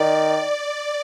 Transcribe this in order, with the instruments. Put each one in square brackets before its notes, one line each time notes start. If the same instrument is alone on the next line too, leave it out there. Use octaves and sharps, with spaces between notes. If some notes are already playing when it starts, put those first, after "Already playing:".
Already playing: [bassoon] D#3 [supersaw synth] D5